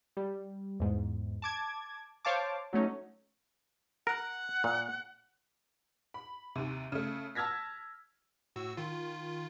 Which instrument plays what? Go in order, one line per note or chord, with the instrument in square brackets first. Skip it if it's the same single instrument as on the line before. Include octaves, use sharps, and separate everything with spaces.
[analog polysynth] G3
E2 G#2
A5 D6 G#6
C5 C#5 F5 A5 D6
F#3 A3 C#4 D#4
[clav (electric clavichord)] A#4 [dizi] F#5
[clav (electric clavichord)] A#2
[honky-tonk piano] B5
D#2 C3
C#3 A3
A5 E6 F6 G#6 A#6 B6
[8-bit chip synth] A2 F#4 E6
D#3 F4